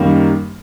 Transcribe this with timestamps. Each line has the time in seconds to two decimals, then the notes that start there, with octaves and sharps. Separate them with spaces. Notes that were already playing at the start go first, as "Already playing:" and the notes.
Already playing: F#2 D#3 G3 A#3